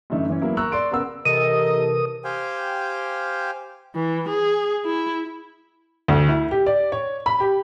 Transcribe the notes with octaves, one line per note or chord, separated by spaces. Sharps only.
F#2 D3 E3 A3 D#4
E3 C#4
F#3 A#3 B3 E4
A#4 A#5 C#6 E6 F#6
D5 C6 D7
C#3 B3 A#4 F#5 E6
C3 E3 A4 A#4 D#5 D#6 D#7
G4 C5 F5 G5 G#5
E3
G#4
E4
D2
E4
G4
D5
C#5
B5
G4